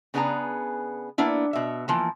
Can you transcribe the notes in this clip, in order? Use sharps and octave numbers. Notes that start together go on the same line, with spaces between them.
C#3 B3 D4 G#4 B4 A#5
A#3 B3 D4 E4
B2 E5
E3 F3 A#3